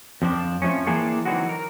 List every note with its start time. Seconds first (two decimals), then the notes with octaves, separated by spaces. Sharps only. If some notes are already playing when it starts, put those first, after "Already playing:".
0.22 F2 F3 D4
0.62 F2 F3 A3 C#4
0.87 E3 A#3 C4 D4 G#4 A4
1.25 D3 E3 F#3 C4 D#4 F#4
1.49 A#4